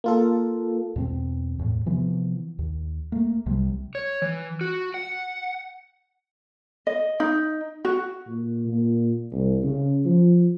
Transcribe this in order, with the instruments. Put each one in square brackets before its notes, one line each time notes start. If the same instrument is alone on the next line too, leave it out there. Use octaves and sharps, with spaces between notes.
[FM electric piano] A#3 F4 A4
[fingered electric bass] E2 B2 A#3 C4
E2 A2
C3 E3 F3 B3
D#2
A3 A#3
C2 C3 F#3 G3
[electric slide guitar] C#5
E3
F#4
F#5
[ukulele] D#5
D#4
F#4
[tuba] A#2
A#2
C2
C#3
F3